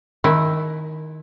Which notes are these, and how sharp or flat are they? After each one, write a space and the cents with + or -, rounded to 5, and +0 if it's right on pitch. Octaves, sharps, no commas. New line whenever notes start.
D#3 +5 G#3 +45 E4 +0